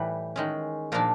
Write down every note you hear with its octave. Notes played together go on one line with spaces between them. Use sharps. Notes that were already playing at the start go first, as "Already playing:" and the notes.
Already playing: A2 E3 G3 B4
D#3 G#3 C#4
A#2 F3 A#3 D4 A#4